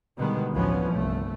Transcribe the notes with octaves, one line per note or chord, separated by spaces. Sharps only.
B2 D3 D#3 G3 G#3 B3
A1 D2 E3 F3 B3 C#4
G1 C2 A3